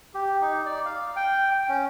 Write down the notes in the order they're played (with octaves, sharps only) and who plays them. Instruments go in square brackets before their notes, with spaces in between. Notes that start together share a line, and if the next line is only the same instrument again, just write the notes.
[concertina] G4
D#4
D5
F5
G5
G5
C#4